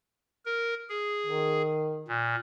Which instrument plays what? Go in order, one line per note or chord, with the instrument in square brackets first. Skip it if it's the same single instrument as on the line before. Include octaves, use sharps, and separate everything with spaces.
[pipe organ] A#4
G#4
[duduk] D#3
[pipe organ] A#2